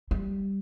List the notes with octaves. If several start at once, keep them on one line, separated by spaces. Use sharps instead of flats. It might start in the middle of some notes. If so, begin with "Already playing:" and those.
G3